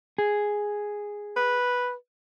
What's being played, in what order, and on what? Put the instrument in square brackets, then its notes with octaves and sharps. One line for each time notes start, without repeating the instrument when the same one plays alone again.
[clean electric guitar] G#4
[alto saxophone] B4